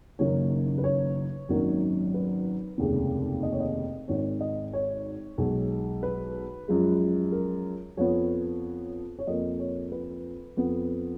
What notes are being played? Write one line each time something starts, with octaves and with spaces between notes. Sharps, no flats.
F#1 F#2 D#3 A#3 C#5
B4
C#5
G#1 F#2 D#3 F#3 A#3
B4
F1 D#2 C#3 G#3
D#5
C#5
D#5
G#1 G#2 D#3 C#5
D#5
C#5
B1 B2 G#3
B4
F#2 F3 G#3
A#4
F2 F3 B3 C#5
C#5
F2 F3 A#3 D#5
C#5
B4
F2 F3 B3